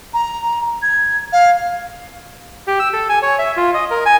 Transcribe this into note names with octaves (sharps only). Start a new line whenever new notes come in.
A#5
G#6
F5
G4
E6
A4
G#5
C#5
E5
F4
D#5
A#4
G#5